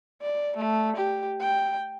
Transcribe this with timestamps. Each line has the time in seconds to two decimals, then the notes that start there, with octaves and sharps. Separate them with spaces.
0.22 D5
0.57 A3
0.96 G4
1.40 G5